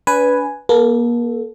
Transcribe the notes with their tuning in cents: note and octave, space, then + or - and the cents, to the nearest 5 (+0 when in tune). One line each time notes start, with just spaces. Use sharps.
D4 -40 B4 +0 G#5 +5
A#3 +35 A4 -15